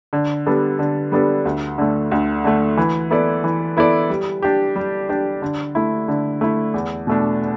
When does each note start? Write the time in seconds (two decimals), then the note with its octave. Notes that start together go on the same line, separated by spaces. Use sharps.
0.13 D3
0.46 G3 B3 D4 A4
0.79 D3
1.12 G3 B3 D4 A4
1.45 D2
1.78 D3 A3
2.11 D2
2.44 D3 A3
2.77 E3
3.11 B3 E4 A4 D5
3.44 E3
3.77 B3 E4 A4 D5
4.10 G3
4.42 D4 G4
4.76 G3
5.09 D4 G4
5.42 D3
5.75 A3 E4
6.08 D3
6.41 A3 E4
6.74 E2
7.07 B2 A3 D4